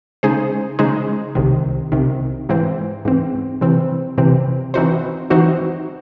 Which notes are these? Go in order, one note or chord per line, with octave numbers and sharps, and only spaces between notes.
C#3 G#3 D#4 G#4 C5
C#3 G#3 D#4 G#4 C5
C2 C3 D#3
C2 C3 D#3
G#2 E3 C4
G#2 E3 C4
C3 E3 C4
C3 E3 C4
E3 C4 D#4 F#4 C5
E3 C4 D#4 F#4 C5